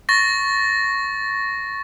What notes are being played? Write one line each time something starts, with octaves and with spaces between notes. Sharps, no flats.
C#6 A6 A#6